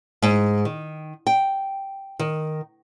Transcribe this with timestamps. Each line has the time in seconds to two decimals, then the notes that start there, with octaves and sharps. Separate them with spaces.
0.22 G#2
0.65 D#3
1.27 G5
2.19 D#3